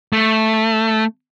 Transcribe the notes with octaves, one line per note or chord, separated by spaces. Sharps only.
A3